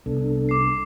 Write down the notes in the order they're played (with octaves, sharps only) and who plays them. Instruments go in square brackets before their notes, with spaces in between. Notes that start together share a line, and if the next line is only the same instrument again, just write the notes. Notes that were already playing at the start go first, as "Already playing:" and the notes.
[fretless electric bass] C2 [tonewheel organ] B3 D4 A4
[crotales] D6 C7